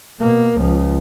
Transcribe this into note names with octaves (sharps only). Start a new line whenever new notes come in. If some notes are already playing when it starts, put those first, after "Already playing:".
B2 A#3
C#2 F3